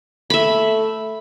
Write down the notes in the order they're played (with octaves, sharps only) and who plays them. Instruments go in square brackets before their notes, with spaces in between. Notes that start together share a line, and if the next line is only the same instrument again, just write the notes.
[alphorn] A3 [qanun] E5 B5